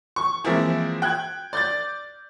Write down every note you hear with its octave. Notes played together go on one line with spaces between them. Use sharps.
C#6
E3 F3 G#3 A#3 C4 E5
G5 F#6 G#6
D5 G6 A6